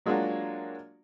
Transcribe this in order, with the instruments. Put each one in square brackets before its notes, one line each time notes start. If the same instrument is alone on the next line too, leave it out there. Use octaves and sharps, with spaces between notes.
[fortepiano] F#3 G#3 A#3 D4 F4 F#4